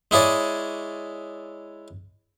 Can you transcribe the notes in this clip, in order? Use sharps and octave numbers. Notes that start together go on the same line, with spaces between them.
G#3 E4 G#4 C#5 D5